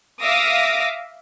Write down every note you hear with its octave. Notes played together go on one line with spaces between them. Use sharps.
E5 F5 D6 D#6 A#6